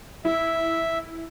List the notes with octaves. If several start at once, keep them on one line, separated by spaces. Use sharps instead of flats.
E4 E5